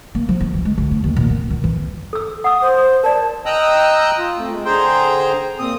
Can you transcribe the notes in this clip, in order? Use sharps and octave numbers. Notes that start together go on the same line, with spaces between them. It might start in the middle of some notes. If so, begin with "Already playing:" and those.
A#3
F3
E4
E3
G#3
D2
D4
D#2
A#2
B3
D#3
E3
A4 E6
F#5 D#6 E6
C5
A#4 D5 A5
D#5 G5 A#5 D#6 E6 F#6
F4
A3 C4
G#3
D3 G#4 C5 G5 A#5 C6
A#2 C4 D#6